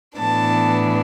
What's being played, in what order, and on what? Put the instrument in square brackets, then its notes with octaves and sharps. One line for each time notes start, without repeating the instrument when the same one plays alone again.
[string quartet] A2 E3 B3 D4 A5